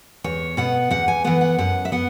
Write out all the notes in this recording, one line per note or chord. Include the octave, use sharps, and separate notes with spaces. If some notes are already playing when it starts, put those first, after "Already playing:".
E2 C#5
B2 B3 F#5
E2 F#5
G#5
E3 B3 F#5
F#5
F#2 F#5
E5
B3 F#5